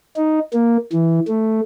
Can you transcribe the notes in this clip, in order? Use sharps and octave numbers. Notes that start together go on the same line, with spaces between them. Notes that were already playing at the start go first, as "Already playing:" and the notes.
D#4
A#3
E3
A3